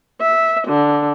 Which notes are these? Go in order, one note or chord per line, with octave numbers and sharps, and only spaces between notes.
E5
D3